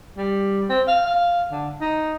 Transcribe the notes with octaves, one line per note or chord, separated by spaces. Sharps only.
G3
C4
F5
F5
D3
D#4